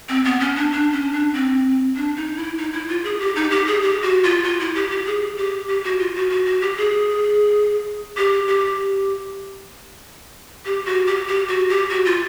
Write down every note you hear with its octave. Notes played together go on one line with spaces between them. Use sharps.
C4
B3
C#4
D4
D4
C#4
D4
C4
D4
D#4
E4
D#4
E4
F4
G#4
G4
D#4
G4
G#4
G4
F#4
F4
F4
E4
G4
G4
G#4
G4
G4
F#4
F4
F#4
F#4
F#4
G4
G#4
G4
G4
G4
F#4
G4
G4
F#4
G4
F#4
F4